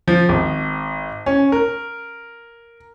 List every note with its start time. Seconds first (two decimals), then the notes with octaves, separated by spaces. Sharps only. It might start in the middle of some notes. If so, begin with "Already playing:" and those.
0.08 F3
0.29 G#1
1.26 C#4
1.52 A#4